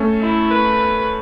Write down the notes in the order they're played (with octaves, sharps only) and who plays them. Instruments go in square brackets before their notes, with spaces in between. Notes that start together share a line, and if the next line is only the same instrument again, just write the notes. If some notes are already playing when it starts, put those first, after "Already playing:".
Already playing: [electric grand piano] A3 C#4 A4
[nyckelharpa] E4
B4